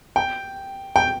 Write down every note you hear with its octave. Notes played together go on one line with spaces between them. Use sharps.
G5
G5